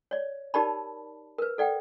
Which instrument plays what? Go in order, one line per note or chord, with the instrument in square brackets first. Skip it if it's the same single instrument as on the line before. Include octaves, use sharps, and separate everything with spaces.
[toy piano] C#5 D5
D#4 G4 A#4 D5 A5 B5
A#4 B4
A4 D5 F#5 G5